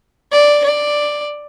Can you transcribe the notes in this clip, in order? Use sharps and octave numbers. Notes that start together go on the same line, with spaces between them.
D5
D5